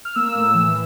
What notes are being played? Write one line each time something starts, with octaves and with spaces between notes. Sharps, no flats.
F6
A#3 E6
A2
E3